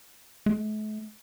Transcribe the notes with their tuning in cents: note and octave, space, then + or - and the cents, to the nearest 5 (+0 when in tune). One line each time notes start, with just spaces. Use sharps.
A3 -45